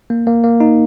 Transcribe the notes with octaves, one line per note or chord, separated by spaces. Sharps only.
A#3
A#3
A#3
D#4